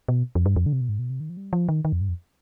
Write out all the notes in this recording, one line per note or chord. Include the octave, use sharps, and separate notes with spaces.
B2
F2
G2
F2
D3
C3
B2
G#2
B2
C3
D#3
F3
G3
F3
D#3
D#3
F2
G2
F2